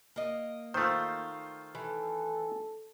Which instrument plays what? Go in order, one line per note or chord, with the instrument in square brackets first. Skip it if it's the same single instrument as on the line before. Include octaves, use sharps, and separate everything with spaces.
[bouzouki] A#3 D#5
[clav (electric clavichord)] D#3 A3 [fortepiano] F4 C5
[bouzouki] E3 [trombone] A4